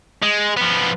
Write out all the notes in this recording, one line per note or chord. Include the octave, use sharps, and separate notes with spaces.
G#3
F3 B3